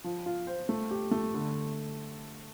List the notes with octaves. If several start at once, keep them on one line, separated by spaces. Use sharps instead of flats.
F3
F4
C5
A3
G4
A3
D3